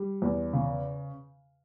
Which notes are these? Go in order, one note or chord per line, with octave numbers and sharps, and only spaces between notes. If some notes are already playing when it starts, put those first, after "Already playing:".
Already playing: G3
E2
C#3